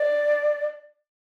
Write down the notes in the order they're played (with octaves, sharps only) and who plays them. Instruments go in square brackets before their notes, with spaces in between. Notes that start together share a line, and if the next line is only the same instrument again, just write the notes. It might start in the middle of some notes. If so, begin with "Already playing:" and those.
Already playing: [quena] D5